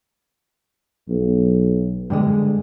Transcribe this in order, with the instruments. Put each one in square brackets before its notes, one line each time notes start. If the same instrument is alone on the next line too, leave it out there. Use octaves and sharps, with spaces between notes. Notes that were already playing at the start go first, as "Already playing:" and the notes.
[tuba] B1
[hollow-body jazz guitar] G2 D3 G#3